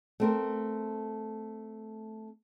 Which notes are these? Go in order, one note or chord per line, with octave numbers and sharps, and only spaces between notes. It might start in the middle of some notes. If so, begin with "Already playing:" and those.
A3 C4 A#4